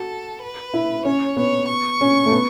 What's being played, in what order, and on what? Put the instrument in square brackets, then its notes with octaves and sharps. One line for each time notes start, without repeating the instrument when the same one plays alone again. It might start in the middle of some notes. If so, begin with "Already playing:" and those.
Already playing: [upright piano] F#4 [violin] A4
[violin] B4
[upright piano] E4
[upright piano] C#4 [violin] C#5
[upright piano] B3 [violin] C#5
[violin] C#6
[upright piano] C#4
A3
B3